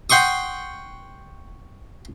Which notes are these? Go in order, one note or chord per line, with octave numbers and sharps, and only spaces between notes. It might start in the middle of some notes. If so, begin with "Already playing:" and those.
F#5 G5 C6 C#6 D#6